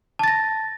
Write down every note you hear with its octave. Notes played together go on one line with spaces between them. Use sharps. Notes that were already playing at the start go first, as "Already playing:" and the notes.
A5 A6 A#6